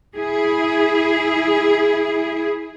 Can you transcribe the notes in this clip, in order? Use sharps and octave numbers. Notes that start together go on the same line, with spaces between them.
E4 G#4